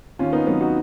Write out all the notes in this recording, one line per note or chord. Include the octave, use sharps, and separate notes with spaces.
D#2 C#4 F4
B3 D#4
D#3 F#3 B3 D#4
D#4 F#4